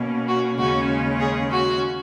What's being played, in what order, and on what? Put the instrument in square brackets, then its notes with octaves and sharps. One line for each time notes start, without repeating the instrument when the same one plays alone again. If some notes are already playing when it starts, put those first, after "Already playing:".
Already playing: [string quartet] B2 A#3 C#4
F#4
D#2 C#3 G#3 C#4 F#4
G#4
F#4